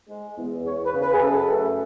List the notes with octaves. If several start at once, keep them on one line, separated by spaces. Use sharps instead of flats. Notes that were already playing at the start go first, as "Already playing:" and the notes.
G#3
E2
E2 C#5
B4
C#3
B4
G#4
F#2 A4
A3